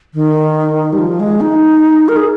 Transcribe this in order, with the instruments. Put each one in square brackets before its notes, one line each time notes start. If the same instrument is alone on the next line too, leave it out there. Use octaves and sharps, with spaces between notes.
[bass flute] D#3
G3
F3
G#3
D#4
A#4
G#4